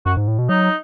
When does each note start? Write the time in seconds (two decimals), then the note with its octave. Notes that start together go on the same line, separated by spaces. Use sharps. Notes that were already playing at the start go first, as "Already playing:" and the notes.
0.06 F#2 F#4
0.17 G#2
0.28 A2
0.38 B2
0.49 F#3 D#4